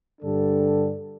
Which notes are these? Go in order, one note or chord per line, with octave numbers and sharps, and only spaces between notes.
G2 D3 G3 D4 A4